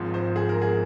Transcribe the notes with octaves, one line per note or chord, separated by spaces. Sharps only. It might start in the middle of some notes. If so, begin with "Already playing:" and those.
Already playing: G#1 G#2 F3
C5
G#4
A#4
G#4